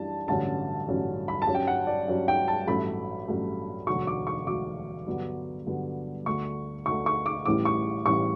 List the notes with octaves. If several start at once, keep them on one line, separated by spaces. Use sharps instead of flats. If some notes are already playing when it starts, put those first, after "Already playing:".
Already playing: F#2 E3 G3 D4 A5
A1 G2 D3 F#3 C#4 A5
A1 G2 D3 F#3 C#4
B5
A5
G2 F#3 C#4
G5
F#5
D5
G2 F#3 C#4
G5
A5
A1 G2 F#3 A3 B5
A1 G2 F#3 A3
E1 D2 D3 F#3 C#6
D6
C#6
E1 D2 D3 F#3 D6
G2 D3 F#3 B3
G2 D3 F#3 B3
D2 D3 A3 C#6
D2 D3 A3 C#6
C#6
D6
A1 A2 E3 G3 D6
C#6
A1 A2 E3 G3 C#6